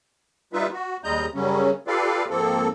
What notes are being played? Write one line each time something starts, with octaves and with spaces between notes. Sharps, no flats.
G3 D#4 F4 B4 E5
F#4
D#2 G3 G#3 D#5 A#5 G6
F#2 C#3 F#3 G3 C#4
F4 G4 A4 B4 D5 F5
G#2 F3 A#3 C4 A4